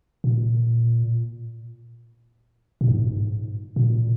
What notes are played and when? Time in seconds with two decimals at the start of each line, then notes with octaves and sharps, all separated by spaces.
0.24 A#2
2.81 A#2
2.88 G#2
3.76 A#2